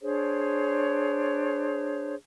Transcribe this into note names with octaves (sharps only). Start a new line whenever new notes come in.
D4 G#4 C5 C#5